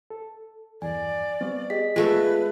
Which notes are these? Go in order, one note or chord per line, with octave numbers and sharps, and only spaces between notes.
A4
E2 G2 D5 G#5
G3 B3 C4
G4 G#4 D#5 B6
G#3 A3 B3 F4 B4 E5